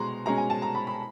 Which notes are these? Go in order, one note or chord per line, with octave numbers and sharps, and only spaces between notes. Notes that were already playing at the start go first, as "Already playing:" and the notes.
Already playing: B2 G#3 A#5 C6
B2 G#3 C#4 A#5
G#5
A5
A#5
B5
B5